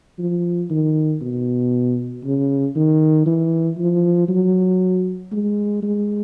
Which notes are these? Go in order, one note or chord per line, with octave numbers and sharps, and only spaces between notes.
F3
D#3
B2
C#3
D#3
E3
F3
F#3
G#3
G#3